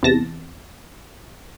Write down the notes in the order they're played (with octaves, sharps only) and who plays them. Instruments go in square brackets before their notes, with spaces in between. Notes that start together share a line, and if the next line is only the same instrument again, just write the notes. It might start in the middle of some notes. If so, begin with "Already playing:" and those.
[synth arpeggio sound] E2 C3 A5 A#6